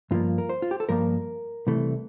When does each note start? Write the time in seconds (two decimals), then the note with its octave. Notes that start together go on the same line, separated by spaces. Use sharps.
0.11 G2 F3 A#3 F4
0.38 A#4
0.49 C5
0.62 F4
0.71 G4
0.80 A4
0.89 G2 F3 A#3 A#4
1.67 C2 C3 E3 A3